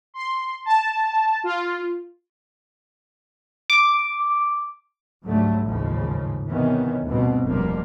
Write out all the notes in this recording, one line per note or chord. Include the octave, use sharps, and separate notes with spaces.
C6
A5
F4
D6
C#2 G#2 D3 F#3 G3 A3
A1 D#2 G#2 C#3 F3
C3 D#3 E3 B3 C#4
D2 G2 B2 C4
F1 D2 B2 F3 G3 A#3